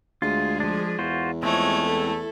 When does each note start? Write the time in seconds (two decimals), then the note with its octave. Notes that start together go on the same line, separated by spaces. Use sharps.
0.22 D2 G#3 F4 G#4
0.60 F3 D4
0.99 E2 F4 F#4 C5
1.43 F3 G#3 A3 C4 C#5
1.83 E4 A4